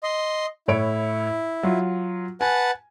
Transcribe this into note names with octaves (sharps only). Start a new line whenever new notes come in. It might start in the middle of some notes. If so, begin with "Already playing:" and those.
D#5 C6
A2 E4 C#5 D7
F#3 F4
B4 F#5 G#5 A5